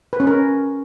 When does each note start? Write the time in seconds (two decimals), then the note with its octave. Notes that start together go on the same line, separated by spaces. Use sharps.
0.13 B4
0.20 C#4
0.27 A#4